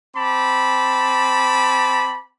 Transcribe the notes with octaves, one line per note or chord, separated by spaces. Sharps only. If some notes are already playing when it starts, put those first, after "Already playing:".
C4 A5 B5 D6